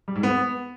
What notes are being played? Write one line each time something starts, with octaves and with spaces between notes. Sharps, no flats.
G3
G#2
B3